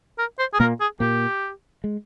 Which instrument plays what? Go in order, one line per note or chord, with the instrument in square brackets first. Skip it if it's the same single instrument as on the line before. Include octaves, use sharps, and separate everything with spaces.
[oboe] A#4
C5
G#4
[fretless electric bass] A#2 A#3 [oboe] A#4
[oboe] G#4
[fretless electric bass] A#2 A#3 [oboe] G4
[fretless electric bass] G#3